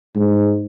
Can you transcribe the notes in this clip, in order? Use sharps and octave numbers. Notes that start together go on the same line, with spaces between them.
G#2